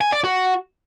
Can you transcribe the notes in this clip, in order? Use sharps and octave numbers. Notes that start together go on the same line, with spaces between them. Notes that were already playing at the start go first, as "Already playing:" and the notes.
G#5
D5
F#4